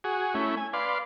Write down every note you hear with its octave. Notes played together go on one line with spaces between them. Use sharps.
F#4 G#4
A3 C#4 E4
G#5
B4 D5 F5 C6